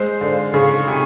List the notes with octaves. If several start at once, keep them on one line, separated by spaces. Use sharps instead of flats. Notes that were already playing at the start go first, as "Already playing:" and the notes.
Already playing: G#3 C5
D3 F5
C#3 C#6
C3 G#5